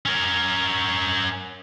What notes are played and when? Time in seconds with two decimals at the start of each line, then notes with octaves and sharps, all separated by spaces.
0.06 C#4 A#4